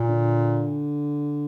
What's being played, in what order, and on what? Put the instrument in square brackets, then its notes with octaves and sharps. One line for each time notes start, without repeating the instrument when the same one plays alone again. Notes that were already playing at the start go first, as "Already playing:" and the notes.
Already playing: [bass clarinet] A#2
[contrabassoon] D3